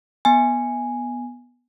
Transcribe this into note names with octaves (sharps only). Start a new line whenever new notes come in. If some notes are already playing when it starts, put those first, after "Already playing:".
B3 G#5